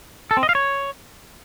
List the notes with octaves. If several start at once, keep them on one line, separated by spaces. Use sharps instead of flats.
A4
C4
D#5
F5
C#5